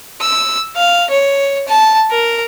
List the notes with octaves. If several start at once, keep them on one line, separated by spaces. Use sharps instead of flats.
E6
F5
C#5
A5
A#4